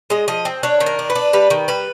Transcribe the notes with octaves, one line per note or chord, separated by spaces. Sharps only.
G#3 D#5
F3 D#5
C4
D4 C#5
D#3
A#4
D4
B4
D4
G3 B4
D#3
G3 B4